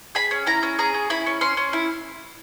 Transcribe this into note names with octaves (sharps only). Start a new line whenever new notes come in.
G#4 B5
C#4
E4 A#5
C#4
G#4 A#5
C#4
E4 B5
C#4
C#4 C6
C#4
E4